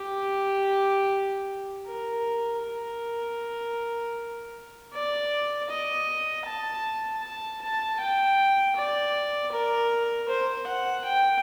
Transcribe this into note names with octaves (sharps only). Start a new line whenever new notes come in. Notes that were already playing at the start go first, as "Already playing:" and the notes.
Already playing: G4
A#4
A#4
D5
D#5
A5
A5
A5
G5
D5
A#4
C5
F#5
G5